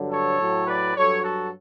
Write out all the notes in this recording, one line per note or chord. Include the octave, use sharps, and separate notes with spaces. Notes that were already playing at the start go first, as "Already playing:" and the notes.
Already playing: G2 D3 F#3
A4 C#5
A2 F#3
B4 D5
G2 F#3 A4 C#5
F#4 A4